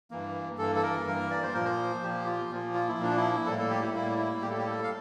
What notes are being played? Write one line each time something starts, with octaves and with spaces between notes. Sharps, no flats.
G2 E3 A#3
G2 E3 A#3 A4
A4
A#4
G2 E3 A#3 A#4
D5
C5
A#2 F3 A#3 A#4
C5
A#2 F3 A#3 G4
F4
A#2 F3 A#3
F4
E4
A#2 F3 A#3 D4
E4
A2 G3 A#3 A4
A4
G4
E4
A2 G3 A#3 E4
E4
A2 G3 A#3 G4
A4
G4
A4
F5